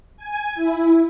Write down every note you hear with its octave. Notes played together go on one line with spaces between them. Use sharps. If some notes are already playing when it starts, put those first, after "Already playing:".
G#5
E4